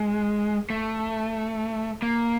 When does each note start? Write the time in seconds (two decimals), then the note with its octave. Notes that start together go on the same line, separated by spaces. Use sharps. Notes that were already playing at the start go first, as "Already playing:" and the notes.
Already playing: G#3
0.70 A3
2.02 A#3